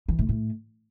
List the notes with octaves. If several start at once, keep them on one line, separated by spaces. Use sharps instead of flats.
E3
A2
A2